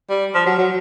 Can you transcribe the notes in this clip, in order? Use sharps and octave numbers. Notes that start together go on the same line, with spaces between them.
G3
F3
F#3
F#3